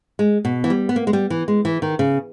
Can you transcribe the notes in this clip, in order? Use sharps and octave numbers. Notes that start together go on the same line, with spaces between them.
G#3
B2
E3
G3
B3
A#3
G#3
G3
E3
G#3
E3
D#3
C#3